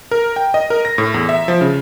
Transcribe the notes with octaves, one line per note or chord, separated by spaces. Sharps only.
A#4
G5
D#5
A#4
A#6
A2
E2
E5
F3
C#3